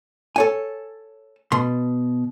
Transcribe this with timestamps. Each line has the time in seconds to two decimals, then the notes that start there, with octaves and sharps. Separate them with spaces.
0.36 A4 C#5 G#5
1.52 B2 C6